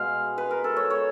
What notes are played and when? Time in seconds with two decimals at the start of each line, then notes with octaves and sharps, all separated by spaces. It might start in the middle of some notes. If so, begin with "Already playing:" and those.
Already playing: B2 G#3 F5
0.38 B4
0.51 A#4
0.64 A4
0.77 C#5
0.90 C#5